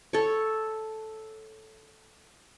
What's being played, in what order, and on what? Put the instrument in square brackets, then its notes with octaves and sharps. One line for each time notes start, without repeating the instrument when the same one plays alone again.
[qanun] A4 C#5